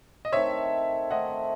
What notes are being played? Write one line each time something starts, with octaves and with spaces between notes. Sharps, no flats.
D#5
D#3 A3 C4 C#5 E5
D#3 A3 C4 D#5 F#5